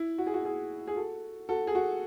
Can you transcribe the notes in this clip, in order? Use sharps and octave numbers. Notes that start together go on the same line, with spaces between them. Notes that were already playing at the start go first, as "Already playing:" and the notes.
Already playing: E4
F#4
G#4
F#4
E4 G#4
G#4
F#4 A4
F#4 A4
G#4
F#4